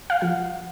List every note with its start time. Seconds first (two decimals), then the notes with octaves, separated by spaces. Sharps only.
0.10 F5
0.21 F3 F#5